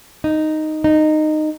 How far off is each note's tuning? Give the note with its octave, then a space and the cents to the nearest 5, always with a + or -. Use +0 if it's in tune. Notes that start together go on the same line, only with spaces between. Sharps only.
D#4 -5
D#4 -15